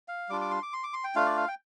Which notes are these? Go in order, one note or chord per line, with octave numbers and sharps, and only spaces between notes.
F5
G3 D4 F4 D6
D6
C6
D6
C6
D6
C6
G5
A3 D4 F4 F5
D5
F5
G5